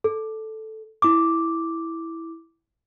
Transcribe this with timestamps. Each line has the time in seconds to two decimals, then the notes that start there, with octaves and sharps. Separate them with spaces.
0.04 A4
1.02 E4 D6